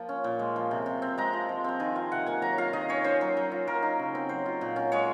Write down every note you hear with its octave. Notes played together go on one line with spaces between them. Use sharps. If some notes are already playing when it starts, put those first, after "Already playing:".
Already playing: F3 A#3 F4
C#4
A#2
G#3
F3
C3
C3
C4
G#3 A#5
F3
F3
C4 A#5
D#3 G#5
F4 F5
C3 F#5
A#3 G#5
F#3 A#5
F4 F5
D#3 D#5
C#4 C#5
C#4 C5
F#3
F#3
F4
F#3 A#4
D#4
C#3
C4
F#3 C5
F4
A#2
C#4
G#3 C#5